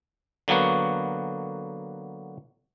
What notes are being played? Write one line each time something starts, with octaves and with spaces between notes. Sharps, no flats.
D3 F#3 A#3 B3 F#4